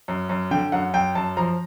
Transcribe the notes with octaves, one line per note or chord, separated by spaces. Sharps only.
F#2
F#2
D3 G5
F#2 F#5
F#2 G5
F#2 A5
F3 A#5